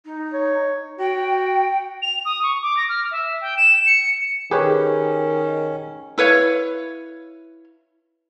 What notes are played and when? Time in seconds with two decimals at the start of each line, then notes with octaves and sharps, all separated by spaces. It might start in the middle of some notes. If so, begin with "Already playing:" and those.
0.05 D#4
0.33 C#5
0.99 F#4 G5
2.02 F7
2.25 D#6
2.43 C#6
2.62 D6
2.77 A#6
2.89 F6
3.11 E5
3.41 G5
3.57 E7
3.86 C#7
4.51 D#3 C#4 G4 G#4 B4 C#5
6.18 E4 B4 C#5 F5